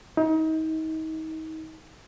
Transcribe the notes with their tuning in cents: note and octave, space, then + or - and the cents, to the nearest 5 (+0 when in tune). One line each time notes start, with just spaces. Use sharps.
D#4 +35